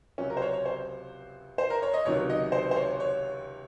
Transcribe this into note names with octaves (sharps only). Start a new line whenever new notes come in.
C#2 C3 F#3 C#4
A#4
C5
C#5
C#5
C5
C5
A#4
C#5
D#5
C#2 C3 D#3 F#3 C#5
D#5
C5
C5
C#5
C#5